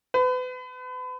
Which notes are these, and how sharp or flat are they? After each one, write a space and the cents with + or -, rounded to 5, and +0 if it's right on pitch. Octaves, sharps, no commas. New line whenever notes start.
B4 +35